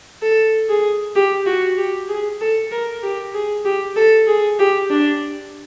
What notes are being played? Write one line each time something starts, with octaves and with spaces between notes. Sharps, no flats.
A4
G#4
G4
F#4
G4
G#4
A4
A#4
G4
G#4
G4
A4
G#4
G4
D4